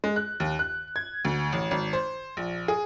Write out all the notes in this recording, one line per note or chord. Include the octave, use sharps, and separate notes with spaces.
G#3
F#6
D#2
F#6
G#6
D2
A1
G#1
C5
A#1
G#4